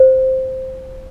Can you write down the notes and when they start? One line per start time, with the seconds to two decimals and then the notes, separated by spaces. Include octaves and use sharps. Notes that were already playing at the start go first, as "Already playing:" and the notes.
Already playing: C5